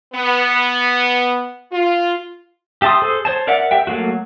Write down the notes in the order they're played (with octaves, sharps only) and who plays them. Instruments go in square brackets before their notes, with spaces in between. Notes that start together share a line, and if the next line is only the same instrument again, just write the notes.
[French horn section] B3
F4
[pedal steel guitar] G4 E5 A5 C6 D#6
G#4 A4 C5
C5 C#5 A5
A#4 D5 E5 F#5
G4 E5 G5
F#3 A3 A#3 F#4